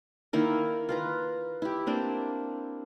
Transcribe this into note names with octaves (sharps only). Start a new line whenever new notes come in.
D#3 A#3 E4 A#4
F4 B4 A#5
E4 G4
A#3 C4 D4